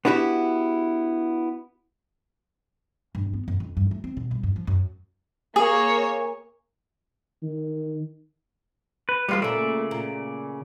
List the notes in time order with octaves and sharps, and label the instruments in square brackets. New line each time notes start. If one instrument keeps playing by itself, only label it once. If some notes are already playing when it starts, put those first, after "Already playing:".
[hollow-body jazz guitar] B3 D4 E4 F#4 G4
[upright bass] G2
B3
F#2
F2
G2
A3
C4
B2
C2
G2
F3
F#2
[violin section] A#3 C#5 [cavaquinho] G#4
[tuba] D#3
[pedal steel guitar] B4
[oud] E3 C4 A4 [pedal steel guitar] G3 G#3 F4
[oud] A#2 A3 [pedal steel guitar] C#3 D5 E5
[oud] A#2